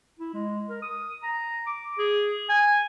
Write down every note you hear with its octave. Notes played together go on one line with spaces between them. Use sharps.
E4
G#3
A#4
D#6
A#5
D6
G#4
G#5